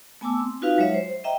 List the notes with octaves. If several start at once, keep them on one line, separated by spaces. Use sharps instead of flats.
A3 B3 G#5 A5 D6 E6
C4
D#4 F4 F#4 B4 F5
F#3 G#3 C#5 E5
C5
D#5 E5 G5 A#5